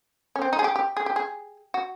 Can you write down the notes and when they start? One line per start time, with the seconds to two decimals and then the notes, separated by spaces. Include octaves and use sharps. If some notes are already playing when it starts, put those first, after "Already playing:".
0.36 C#4
0.42 C4
0.53 D#4
0.59 G#4
0.64 G4
0.76 G4
0.97 G#4
1.06 G4
1.16 G#4
1.74 F#4